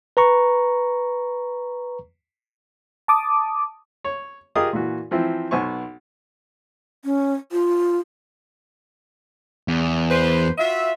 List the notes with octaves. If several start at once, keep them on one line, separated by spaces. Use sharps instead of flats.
B4 A#5 C#6
A5 D6 D#6
C#5
F4 G4 G#4 A#4 D#5 D#6
A#2 E3 F#4
E3 F3 C4 E4
B1 B3 C5 G#5 C#6
C#4
F4
E2
B4 C5
F4 F#4 E5